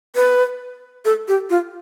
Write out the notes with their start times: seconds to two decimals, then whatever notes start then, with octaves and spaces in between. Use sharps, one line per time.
0.16 B4
1.05 A4
1.28 G4
1.50 F4